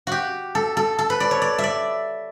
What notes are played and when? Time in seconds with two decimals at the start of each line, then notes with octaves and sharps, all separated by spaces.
0.07 F#4 G4
0.55 A4
0.77 A4
0.99 A4
1.10 B4
1.20 D5
1.31 C#5
1.42 D5
1.58 E5
1.64 D5